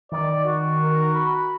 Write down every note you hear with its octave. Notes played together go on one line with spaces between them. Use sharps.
D#3 D5
F#4
A#4
B5